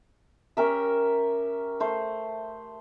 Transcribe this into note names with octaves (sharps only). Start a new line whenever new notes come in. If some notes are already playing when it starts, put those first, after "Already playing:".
C#4 G4 A#4 E5
A3 C5